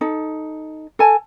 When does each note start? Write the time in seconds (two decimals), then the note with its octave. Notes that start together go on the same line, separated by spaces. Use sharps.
0.01 D#4 A4
0.99 A4 G#5 A5